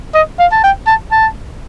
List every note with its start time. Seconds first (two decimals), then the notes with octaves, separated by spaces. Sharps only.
0.14 D#5
0.39 F5
0.52 A5
0.64 G5
0.87 A5
1.12 A5